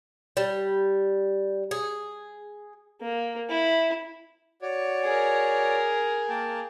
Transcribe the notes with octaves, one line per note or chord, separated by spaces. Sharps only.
G3
G#4
A#3
E4
F#4 C#5 D5
G#4 A#4
A#3 G5 A5